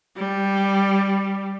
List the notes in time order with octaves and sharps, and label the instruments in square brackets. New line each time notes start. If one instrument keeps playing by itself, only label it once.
[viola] G3